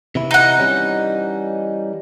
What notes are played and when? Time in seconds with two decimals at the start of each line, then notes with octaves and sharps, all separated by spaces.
0.15 C3 E3 E4
0.31 D#4 F#5
0.59 E3 G3 C#4